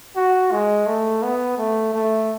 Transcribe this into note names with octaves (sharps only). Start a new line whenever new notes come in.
F#4
G#3
A3
B3
A3
A3